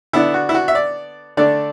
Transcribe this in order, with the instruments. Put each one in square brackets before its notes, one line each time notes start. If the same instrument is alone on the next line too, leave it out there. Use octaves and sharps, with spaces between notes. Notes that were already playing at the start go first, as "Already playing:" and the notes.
[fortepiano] D3 B3 D4 E4
F#4
E4
F#4
E5
D5
D3 A3 D4 D5